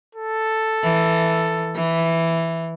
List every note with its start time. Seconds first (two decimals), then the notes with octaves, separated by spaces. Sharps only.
0.15 A4
0.83 E3
1.75 E3